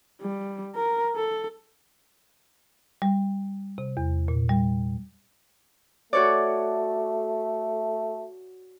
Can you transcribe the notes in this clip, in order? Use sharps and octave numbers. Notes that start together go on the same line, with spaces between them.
G3
A#4
A4
G3
C3
E2
A#2
G3
A3 F#4 C#5 D5